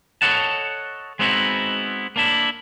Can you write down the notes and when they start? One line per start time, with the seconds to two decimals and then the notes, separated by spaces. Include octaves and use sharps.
0.22 A4 B4 C#5 D#5 F#5 A5
1.19 G#3 B3 C4 D#4 E4 F#4
2.16 A#3 D4 E4